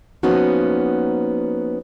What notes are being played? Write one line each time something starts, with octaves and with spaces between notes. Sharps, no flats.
F3 A#3 B3 C#4 D#4 F#4